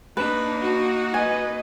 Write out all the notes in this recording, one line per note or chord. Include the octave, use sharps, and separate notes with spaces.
A#3 D4 D#4 B4
F#4
B4 D#5 G#5